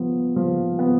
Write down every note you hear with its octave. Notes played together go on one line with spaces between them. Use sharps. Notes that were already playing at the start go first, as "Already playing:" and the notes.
Already playing: F3 B3
F3
B3